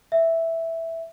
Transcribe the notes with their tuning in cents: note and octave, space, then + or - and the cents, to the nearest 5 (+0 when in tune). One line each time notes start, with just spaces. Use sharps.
E5 +0